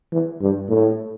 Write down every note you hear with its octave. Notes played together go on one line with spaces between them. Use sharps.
E3
G2
A2